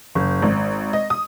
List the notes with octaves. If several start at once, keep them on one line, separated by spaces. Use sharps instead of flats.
F#1
G#1
D#5
D#6